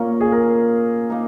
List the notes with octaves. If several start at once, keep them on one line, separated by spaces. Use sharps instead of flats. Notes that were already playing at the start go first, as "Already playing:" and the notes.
Already playing: A#2 A#3 C#4 A#4
G#4
A#4
A#3 D#4